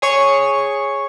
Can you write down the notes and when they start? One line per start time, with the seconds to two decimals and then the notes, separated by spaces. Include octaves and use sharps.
0.02 G#4 C#5 C#6